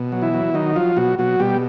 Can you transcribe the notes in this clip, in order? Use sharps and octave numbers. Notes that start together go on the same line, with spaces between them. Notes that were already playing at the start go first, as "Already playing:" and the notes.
Already playing: B2
F#3
E3 E4
F#3
D#3 F#3 D#4
F3 F#3 F4
B2 F#3 F#4
B2 F#3 F#4
B2 G3 G4